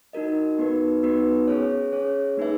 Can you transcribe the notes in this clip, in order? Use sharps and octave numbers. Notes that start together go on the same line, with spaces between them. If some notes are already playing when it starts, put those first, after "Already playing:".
D#4 F#4 A#4 D#5
B3 D#4 F#4 B4
B3 D#4 F#4 B4
C#4 G#4 C#5
C#4 G#4 C#5
A#3 D#4 G#4 B4 E5